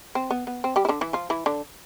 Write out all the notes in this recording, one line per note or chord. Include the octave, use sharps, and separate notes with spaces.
C4
B3
B3
C4
G3 G4
E4
D3 D4
E3 E4
F3 F4
E3 E4
D3 D4